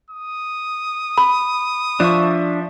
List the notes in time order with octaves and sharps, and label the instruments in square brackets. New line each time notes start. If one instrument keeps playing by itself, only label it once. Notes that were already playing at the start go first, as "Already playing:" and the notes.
[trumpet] D#6
[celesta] B5
[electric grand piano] F3 [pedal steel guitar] D4 E5 C#6